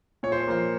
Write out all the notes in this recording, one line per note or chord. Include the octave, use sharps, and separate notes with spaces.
A#2 C#5
C5
F3 A#3 C5